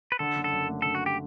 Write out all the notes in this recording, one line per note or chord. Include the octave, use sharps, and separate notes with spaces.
B4
D3 A4
F#1
A4
F#2
A3
D3 A4
F#4
G4